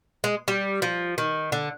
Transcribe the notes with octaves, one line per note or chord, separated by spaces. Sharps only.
G#3
G3
F3
D#3
D3